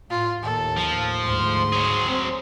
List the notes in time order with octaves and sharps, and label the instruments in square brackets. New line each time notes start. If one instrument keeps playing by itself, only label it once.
[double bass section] A2 [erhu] F4
[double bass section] D#2 A2 [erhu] A4
[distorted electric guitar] F3
[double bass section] D2 G#2 [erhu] C6
[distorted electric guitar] F#3 G#4
[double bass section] C4